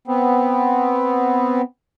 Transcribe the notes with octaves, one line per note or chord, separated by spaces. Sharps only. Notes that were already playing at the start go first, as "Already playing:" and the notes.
B3 C4